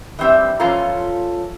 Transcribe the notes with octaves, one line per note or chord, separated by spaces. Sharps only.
E3 G3 C4 G4 E5
E3 F3 C#4 F4 A4 A#5